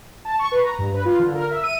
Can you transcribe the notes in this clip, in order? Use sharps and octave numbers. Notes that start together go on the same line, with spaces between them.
A5
C#6
B4
A#5
G2
B4
F4
D3
A#4
E5
D#7